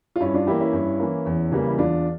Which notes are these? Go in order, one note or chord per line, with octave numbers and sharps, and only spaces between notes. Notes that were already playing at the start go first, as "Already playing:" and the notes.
F4
G2 C#4 E4
D4 F4
E3 A#3 E4 G4
C#4 E4
G2
E3 A#3
E2
C#3 E3 G3 A#3
E4
E2 D4 F4